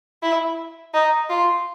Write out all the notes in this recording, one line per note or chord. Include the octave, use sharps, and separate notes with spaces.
E4
D#4
F4